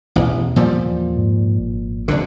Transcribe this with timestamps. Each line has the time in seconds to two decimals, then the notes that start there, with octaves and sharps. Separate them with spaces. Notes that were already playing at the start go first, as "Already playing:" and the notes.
0.16 A1 E2 B2
0.56 A#2 F3 G3
0.79 E2
1.16 G#2
1.59 G#1
2.08 F1 D2 D3